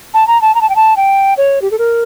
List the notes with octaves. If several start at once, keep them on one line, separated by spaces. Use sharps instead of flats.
A5
A#5
A5
A#5
A5
G5
A5
G5
C#5
G4
A4
A#4